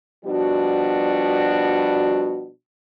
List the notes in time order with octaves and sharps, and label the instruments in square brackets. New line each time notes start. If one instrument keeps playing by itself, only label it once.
[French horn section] B2 F3 G3 D4 F#4